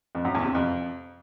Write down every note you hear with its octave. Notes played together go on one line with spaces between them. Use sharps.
F2
F#2
E2
C3
F2